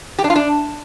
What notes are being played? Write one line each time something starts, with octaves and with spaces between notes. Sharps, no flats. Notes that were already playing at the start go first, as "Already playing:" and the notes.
G4
D4
F4
D4